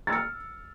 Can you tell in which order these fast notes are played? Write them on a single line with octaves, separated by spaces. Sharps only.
A6 E6 C#7 F6